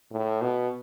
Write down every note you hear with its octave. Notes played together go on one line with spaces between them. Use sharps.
A2
B2